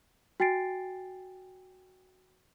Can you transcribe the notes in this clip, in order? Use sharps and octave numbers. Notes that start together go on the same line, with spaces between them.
F#4 G5 G#5 A6 C7 D7